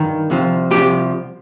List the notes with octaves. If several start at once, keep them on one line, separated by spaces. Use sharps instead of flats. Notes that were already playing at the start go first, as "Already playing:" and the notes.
Already playing: G2 D#3
C2 C3 F3
C2 C3 F3 G4